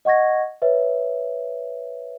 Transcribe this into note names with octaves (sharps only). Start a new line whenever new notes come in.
D#5 F#5 C#6 G#6 A#6
B4 C#5 E5